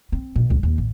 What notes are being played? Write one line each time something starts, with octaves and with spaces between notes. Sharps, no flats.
C4
B2
C#2
D#2
A1